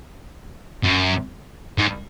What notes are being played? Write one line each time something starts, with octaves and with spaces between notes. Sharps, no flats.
F#2
G#2